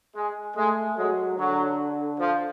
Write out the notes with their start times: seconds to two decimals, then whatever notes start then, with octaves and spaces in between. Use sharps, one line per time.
0.16 G#3
0.57 G#3 A3
0.97 F#3 G#3
1.38 D3 F#3
2.20 F3